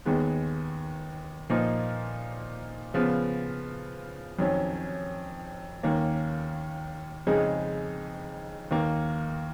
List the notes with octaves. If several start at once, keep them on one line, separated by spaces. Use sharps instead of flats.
D#2 D#3 G#3 B3
A#2 F3 A#3 D#4
C#3 F3 B3
F2 D#3 F#3 C#4
D#2 D#3 A#3 C#4
F2 C#3 G#3 D#4
D#2 D#3 A#3